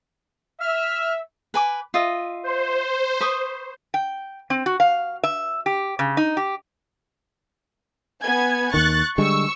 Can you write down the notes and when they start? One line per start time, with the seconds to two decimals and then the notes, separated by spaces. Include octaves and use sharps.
0.60 E5 F6
1.54 B4 G#5 D6
1.94 F4 D#5 E5
2.43 C5
3.21 B4 C#6 D#6
3.94 G5
4.50 C4
4.66 F#4
4.80 F5
5.23 E5
5.66 G4
5.99 C#3
6.17 D#4
6.37 G4
8.22 B3 G#5 G#6
8.74 D#2 D#3 C#6 F#6 A6
9.18 D3 G3 G#3 C#6 E6